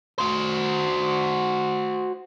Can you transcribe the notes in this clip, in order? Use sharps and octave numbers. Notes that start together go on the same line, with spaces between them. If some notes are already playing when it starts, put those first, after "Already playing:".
F#4 C5